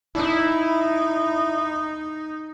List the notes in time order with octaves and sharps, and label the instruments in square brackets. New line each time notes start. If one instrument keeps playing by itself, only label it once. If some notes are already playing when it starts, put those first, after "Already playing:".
[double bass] D#4 [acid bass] E4